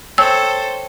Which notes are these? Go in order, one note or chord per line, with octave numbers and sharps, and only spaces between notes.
A4 C5 C#5 G5 A5 E6